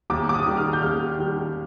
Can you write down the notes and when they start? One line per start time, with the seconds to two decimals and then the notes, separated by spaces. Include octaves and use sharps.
0.10 D#2 D6
0.29 D6
0.34 D#6
0.46 D#3 G3
0.57 F6
0.73 G6
0.82 D#2 F6
1.18 D#3 G3